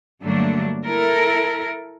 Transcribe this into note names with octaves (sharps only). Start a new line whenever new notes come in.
G2 D3 F#3 A3 A#3 D4
E4 A4 A#4